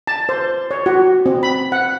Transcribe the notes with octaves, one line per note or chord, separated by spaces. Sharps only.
A5
C5
C#5
F#4
C4
B5
F#5